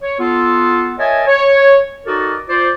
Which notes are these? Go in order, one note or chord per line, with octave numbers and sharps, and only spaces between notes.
C#5
B3 F4 A4
A#4 C#5 D#5 E5 G#5 A5
C#5
D#4 F#4 A4 A#4 D5 D#5
F4 C5 D5